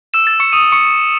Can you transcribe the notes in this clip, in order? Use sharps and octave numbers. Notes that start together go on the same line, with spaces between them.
E6 E7
A6
C#6 C#7
D#6 D#7
C#6 C#7